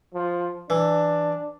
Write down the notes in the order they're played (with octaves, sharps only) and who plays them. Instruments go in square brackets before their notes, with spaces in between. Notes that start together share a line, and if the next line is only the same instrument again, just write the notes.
[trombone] F3
[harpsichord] E3 [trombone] D4